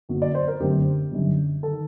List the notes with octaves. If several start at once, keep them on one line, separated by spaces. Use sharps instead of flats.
G1 F#2 F#3 A#3
D5
C5
A#4
G1 F#2 D3 A3 C4 G4
G1 F#2 D3 G3
D#3 A4